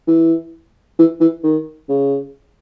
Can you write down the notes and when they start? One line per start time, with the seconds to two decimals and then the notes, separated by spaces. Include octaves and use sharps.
0.07 E3
0.99 E3
1.20 E3
1.43 D#3
1.89 C#3